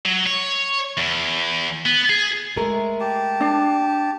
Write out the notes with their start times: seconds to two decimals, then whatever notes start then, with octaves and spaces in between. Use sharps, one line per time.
0.05 F#3
0.26 C#5
0.97 E2
1.86 B3
2.10 G#4
2.56 G#3 A3 A#4
3.00 G4 A5
3.41 D4